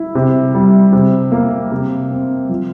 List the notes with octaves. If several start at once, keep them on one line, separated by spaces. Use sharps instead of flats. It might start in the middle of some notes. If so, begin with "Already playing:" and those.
Already playing: E4
C3
G3
C3
A#3
C3
C4
F3